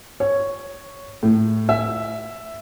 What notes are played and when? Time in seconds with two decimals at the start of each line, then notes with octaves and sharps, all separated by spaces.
0.20 C#5
1.23 A2
1.69 E5